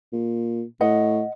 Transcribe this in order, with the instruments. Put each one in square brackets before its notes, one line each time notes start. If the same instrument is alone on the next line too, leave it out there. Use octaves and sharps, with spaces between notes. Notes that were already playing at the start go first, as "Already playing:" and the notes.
[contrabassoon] A#2
[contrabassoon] A2 [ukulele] D#5 F#5